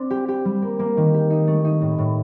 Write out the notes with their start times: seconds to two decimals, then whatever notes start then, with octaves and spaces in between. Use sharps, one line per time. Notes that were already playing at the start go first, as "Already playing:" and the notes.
Already playing: C4 D4
0.10 G4
0.28 G4
0.45 G3
0.62 A#3
0.79 A#3
0.97 D#3
1.14 G4
1.30 D#4
1.47 A3
1.65 D#4
1.81 A2
1.98 A2